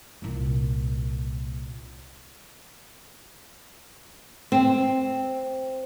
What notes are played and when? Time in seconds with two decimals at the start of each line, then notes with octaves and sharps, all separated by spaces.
0.22 C2 A#2
4.52 C4